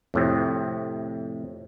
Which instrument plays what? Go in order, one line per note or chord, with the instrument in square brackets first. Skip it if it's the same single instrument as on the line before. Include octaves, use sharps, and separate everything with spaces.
[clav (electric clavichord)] F2 A2 C3